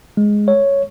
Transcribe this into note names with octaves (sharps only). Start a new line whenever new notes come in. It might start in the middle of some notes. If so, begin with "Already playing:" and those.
G#3
C#5